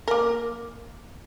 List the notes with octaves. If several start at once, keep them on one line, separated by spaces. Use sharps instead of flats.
A#3 A#4